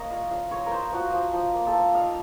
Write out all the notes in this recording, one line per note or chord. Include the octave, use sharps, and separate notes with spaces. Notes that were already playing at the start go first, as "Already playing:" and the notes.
Already playing: A#3 A#4 C#5 D#5
F4 F5
F3 F5
F4 C#5
A#4
F4 C5
F3 F#4
F3
F3
A#3
A4
F3
D#4 F5